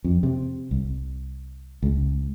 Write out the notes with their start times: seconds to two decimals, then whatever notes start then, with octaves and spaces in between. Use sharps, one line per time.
0.04 F2
0.23 C3
0.71 C2
1.83 C#2